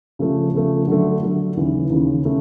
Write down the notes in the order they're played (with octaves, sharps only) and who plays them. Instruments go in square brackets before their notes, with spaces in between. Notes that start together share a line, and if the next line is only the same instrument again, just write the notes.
[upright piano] C#3 F3 A3
C#3 F3 A3
D3 F#3 A3
D3 F#3 A3
D#2 C#3 E3
D#2 C#3 E3
C#3 A3